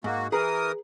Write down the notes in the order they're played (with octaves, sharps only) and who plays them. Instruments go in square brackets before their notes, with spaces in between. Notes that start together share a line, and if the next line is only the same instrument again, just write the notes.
[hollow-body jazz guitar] G#2 [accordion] A#3 F#4
[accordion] E3 A#4 D#6 [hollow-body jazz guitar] G#4 B4 A#5